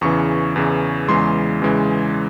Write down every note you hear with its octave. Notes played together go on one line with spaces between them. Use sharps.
E2 C#3 E3 C#6
E2 C#3 E3
E2 C#3 E3 G#3 C6
E2 C#3 E3 G#3